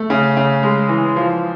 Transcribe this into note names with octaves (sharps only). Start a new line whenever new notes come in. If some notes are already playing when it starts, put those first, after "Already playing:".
Already playing: A3
C#3
C#3
G#3
E3
F3